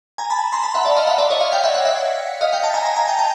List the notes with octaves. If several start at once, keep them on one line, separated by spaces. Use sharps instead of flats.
G#5 A#5
A5 B5
A#5 C6
A5 B5
E5 F#5
D5 E5
D#5 F5
E5 F#5
D5 E5
C#5 D#5
D#5 F5
F5 G5
E5 F#5
E5 F#5
E5 F#5
D#5 F5
F5 G5
G5 A5
G#5 A#5
G#5 A#5
G#5 A#5
G5 A5
G5 A5